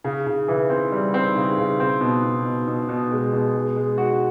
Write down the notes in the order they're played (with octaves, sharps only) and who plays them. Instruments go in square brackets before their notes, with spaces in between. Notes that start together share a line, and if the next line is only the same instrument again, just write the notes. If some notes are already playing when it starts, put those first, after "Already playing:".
[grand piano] C#3
C#3
E3
C4
G3
C4
C#3
C#3
C4
B2
B2
B2
B2
B2
G#3
B2
G#3
G#3
F#4